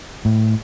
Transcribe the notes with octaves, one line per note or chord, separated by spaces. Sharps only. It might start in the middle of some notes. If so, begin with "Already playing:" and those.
A2